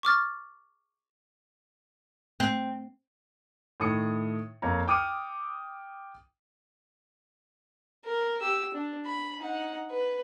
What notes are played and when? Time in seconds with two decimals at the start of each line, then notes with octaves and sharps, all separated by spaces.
0.03 C#6 D6 F6 A6
2.40 C4
3.80 A2 D#3 D#6 C#7
4.62 F2 A#3 C#5 A#5
4.88 G5 D6 D#6 F6 C#7 D#7
8.05 A#4
8.41 G4 E6
8.74 D4
9.06 B5
9.40 D#4 F#5
9.91 B4